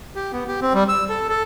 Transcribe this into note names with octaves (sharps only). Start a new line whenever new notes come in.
G4
B3
G4
C4
G3
E6
A4
A4